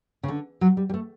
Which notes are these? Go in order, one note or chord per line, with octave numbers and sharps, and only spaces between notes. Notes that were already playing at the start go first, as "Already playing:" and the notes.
C#3
D3
F#3
G3
G3
A3